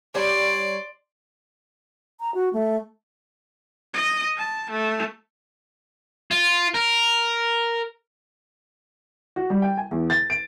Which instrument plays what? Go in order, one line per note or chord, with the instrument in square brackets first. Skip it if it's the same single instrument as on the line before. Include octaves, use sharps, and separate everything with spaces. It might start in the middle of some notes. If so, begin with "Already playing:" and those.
[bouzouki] G3 C#5 [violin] D5 C6
[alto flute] A#5
F#4
A3
[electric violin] D#5
A5
A3
[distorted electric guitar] F4
A#4
[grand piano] F#4
G3
G5
G#5
E2
A6
D7